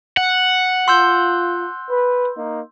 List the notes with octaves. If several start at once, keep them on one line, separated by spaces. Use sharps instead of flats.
F#5
F4 C6 E6 G6
B4
A#3 D#4